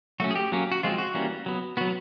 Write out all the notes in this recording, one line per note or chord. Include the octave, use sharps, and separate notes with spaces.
F#3 A3 C#4 F#4
G#4
G4
F#3 A#3 C#4
F#4
F3 G#3 C4 F4
F#4
E3 G3 A#3 C#4
F#3 B3
F#3 B3 F#4